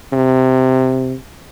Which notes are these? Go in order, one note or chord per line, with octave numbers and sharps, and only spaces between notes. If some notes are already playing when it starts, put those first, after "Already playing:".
C3